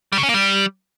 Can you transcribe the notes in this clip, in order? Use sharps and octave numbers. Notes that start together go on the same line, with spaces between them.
G3
C#3
C#4
A#3
G3